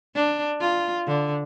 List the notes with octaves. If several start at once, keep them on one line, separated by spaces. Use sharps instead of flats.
D4
F4
D3